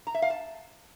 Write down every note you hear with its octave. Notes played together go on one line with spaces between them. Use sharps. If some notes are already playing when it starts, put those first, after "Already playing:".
A#5
E5
F5
A5